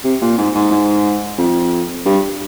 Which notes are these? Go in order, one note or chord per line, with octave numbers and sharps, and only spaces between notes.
C3
A#2
G#2
G#2
G#2
F2
G2